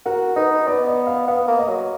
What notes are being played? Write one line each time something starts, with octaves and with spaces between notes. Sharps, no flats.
F#4 A#4
D#4 B4
B3 D5
D#5
F5
B3 F5
A#3
D#5
F#3